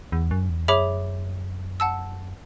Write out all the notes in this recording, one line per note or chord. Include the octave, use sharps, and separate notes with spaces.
E2
F#2
E2
F#2 G#4 C#5 E5 B5 D6
F#5 A5 E6